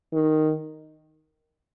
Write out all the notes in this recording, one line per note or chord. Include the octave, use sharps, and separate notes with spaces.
D#3